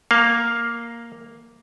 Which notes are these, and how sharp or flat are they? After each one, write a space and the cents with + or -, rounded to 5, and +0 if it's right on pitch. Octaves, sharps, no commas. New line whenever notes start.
A#3 +0 F5 +0